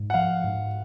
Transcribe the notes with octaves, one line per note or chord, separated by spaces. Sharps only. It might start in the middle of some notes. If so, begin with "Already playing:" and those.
Already playing: G#2
F#5
F3 F5
G#2